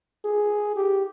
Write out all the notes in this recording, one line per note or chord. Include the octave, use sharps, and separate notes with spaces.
G#4
G4